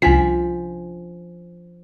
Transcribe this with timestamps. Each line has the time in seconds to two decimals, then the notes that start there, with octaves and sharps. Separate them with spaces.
0.02 C2 F3 C#4 D4 G#5 B6